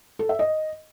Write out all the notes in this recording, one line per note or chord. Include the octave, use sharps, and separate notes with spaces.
A4
E5
D#5